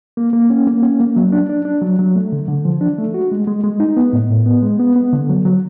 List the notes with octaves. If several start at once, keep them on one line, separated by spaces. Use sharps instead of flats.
A#3
A#3
C#4
A#3
C#4
A#3
F#3
D4
D4
D4
F#3
F#3
A3
D3
D3
F3
D4
A3
F#4
G#3
G#3
G#3
D#4
B3
A2
A2
B3
G#3
B3
B3
D3
F#3
F#3